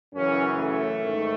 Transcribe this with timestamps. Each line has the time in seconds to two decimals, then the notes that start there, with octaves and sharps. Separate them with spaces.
0.13 F#2 C#3 E3 C#4
0.57 A3
1.00 G#2 D#3